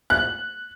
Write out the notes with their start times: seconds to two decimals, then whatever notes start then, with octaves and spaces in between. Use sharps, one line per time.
0.10 F#6